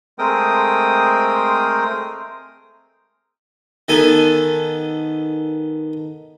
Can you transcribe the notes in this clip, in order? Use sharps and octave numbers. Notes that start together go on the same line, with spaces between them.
G#3 A3 C4 A#4 G5 D#6
D#3 B3 A4 G#5